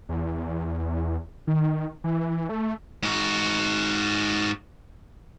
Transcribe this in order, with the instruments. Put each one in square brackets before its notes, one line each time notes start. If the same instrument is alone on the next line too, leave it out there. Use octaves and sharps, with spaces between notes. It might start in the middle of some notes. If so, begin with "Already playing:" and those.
[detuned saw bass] E2
D#3
E3
A3
[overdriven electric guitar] G#2 F#4